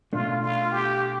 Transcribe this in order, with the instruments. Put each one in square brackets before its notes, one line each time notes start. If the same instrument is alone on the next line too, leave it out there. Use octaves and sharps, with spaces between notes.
[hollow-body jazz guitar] B2 A3 D4 [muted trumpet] F4
[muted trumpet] F4
G4